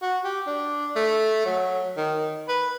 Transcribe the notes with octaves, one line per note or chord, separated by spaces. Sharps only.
F#4
G4
D4
A3
F#3
D#3
B4